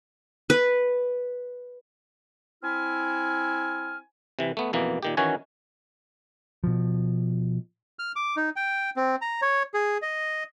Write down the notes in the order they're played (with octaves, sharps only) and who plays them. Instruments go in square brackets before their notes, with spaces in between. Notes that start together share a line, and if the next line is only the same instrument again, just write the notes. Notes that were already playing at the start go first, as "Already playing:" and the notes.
[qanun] B4
[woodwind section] C4 E4 G#5 F6
[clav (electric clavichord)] C3 E3
A3 B3
F2 B2 E3 A#3
A#2 D#3 G4
D#3 E3 C#4 F#4 C#5 G#5
[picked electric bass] B2 F3
[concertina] F6
D6
D#4
G5
C4
A#5
C#5
G#4
D#5